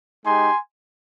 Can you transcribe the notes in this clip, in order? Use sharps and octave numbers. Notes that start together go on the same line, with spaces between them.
G#3 D#4 G4 G#5 C6